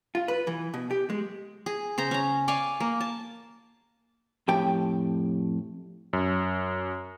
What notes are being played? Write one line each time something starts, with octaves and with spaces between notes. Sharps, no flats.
F4
B4
E3
B2
G4
G#3
G#4
C#3 C5 A#5
C#4 A#5
D5 F5 G#5 C#6
A#3
A5
F2 A2 G4 G5
F#2